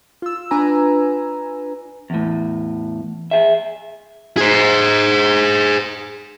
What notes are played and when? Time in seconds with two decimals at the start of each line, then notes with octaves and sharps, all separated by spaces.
0.22 F4 E6
0.51 D4 B4 G#5 A#5
2.10 E2 A2
3.31 G#4 E5
4.37 G#4 C5